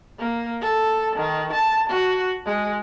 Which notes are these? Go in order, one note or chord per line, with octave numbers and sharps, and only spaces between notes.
A#3
A4
D#3
A5
F#4
G#3